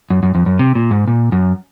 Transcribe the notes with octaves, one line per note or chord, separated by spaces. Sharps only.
F#2
F#2
F2
F#2
C3
A#2
G#2
A#2
F#2